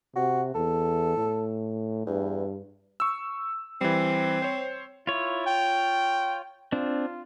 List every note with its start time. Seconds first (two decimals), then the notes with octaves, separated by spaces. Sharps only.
0.16 C3 F#4
0.55 E2 A4
1.16 A2
2.06 E2 G2
3.00 C#6 E6
3.81 E3 G3 C4
4.42 C5 C#5
5.07 E4 F4 C#5
5.46 G5
6.72 C4 D4 F4